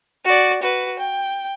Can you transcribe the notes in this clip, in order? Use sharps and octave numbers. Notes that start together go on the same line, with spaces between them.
F#4 D5
F#4 B4
G5